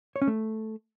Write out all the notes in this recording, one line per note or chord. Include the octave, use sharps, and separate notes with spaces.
C#5
C#4
A3